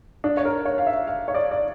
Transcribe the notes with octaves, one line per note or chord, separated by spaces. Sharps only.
D4
C#5
A#4
C#5
F5
E5
F5
C#5
D5
D5